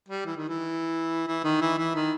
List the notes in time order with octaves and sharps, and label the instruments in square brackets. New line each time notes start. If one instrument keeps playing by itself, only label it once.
[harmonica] G3
E3
D#3
E3
E3
D#3
E3
E3
D#3